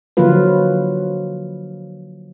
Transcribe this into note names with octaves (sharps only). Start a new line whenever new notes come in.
D3 F3 F#3 A#3 F4 B4